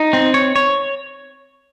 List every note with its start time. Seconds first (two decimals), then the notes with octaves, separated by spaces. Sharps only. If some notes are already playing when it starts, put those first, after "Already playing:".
Already playing: D#4
0.13 C4
0.34 C#5
0.56 C#5